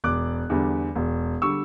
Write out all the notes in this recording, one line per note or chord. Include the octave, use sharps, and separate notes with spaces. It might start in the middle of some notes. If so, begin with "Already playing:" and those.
E1 D6 F#6
E2 D3 G3
E1
D3 G3 C#6 E6